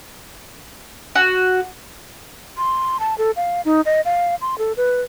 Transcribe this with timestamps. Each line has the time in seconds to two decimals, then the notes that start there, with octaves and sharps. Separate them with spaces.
1.15 F#4
2.57 C6
3.00 A5
3.18 A4
3.36 F5
3.65 D#4
3.86 D#5
4.05 F5
4.41 C6
4.58 A4
4.77 B4